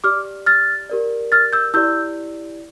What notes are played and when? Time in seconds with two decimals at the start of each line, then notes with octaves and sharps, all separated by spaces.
0.04 G4 D5 D6 F6
0.46 F6 A6
0.89 G4 A#4 D5
1.32 F6 A6
1.53 E6 G6
1.74 E4 G4 D5 E6 G6